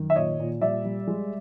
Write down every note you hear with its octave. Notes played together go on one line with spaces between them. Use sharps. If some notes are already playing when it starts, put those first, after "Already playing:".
Already playing: F#2 D#3
E5
A#2 C#5 D#5
A#2
G3 D5 E5
G3
G#3